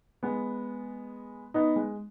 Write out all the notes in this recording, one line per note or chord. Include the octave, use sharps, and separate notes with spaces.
G#3 B3
B3 D#4
G#3